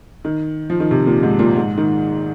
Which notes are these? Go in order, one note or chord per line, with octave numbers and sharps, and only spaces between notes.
D#3
F3
D#3
C3
A#2
G#2
A#2
G#2
D#3